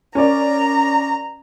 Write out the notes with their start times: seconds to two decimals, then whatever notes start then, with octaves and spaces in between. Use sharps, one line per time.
0.15 C#4 A#4 D5 A#5